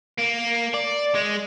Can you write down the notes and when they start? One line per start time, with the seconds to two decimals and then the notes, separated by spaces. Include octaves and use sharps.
0.18 A#3
0.74 D5
1.15 G#3